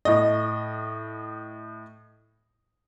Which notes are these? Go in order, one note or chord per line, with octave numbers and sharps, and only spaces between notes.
A2 D#5